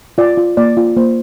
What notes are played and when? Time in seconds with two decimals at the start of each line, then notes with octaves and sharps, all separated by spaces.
0.18 F4 D5
0.37 F4
0.57 A#3 D5
0.77 F4
0.97 A#3 C5